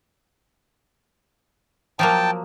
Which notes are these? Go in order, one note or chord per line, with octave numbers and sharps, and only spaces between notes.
F3 F#3 A#3 G5 A5